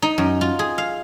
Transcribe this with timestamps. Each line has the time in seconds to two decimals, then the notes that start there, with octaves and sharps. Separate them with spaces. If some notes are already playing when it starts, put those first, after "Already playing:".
0.02 D#4
0.18 F#2
0.41 F4
0.59 G#4
0.78 F5